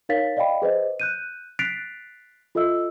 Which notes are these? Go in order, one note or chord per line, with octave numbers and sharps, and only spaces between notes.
D#4 A#4 C#5 F5 A6 B6
D5 D#5 F5 G5 B5
G#4 B4 C5 D#5
F#6 G6 D#7
F#6 A6 B6 C7 D7 F7
F4 A4 D#5 E5 E6